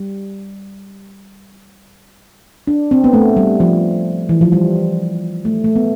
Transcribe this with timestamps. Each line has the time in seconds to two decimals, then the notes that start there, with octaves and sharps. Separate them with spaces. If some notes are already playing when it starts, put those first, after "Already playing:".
Already playing: G3
2.67 D4
2.91 C4
3.04 B3
3.13 A3
3.37 G3
3.60 F3
4.29 E3
4.41 F3
4.52 G3
5.45 A3
5.64 A3
5.76 B3